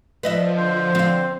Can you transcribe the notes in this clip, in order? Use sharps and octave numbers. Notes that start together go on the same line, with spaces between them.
F3 B4 D#5 E5
D3 C5
C4 F5